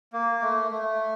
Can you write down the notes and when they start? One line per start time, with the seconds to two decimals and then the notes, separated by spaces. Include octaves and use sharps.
0.13 A#3
0.42 A3
0.72 A3